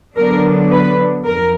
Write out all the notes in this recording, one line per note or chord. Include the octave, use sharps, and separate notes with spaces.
D3 F#3 B3 D4 A#4
B4
F2 A#4